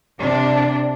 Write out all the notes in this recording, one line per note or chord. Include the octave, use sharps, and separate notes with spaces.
C3 D4